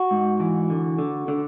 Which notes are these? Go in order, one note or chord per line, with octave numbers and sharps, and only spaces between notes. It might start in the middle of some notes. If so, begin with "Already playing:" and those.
Already playing: F#4
G#2
E3
D3
D3
D3